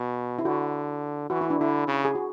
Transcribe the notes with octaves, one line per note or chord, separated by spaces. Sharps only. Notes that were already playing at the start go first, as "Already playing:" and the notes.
Already playing: B2
E4
D3 F#4
E3 F#4
E4
D4
D3 E4
C#3
G#4
F#4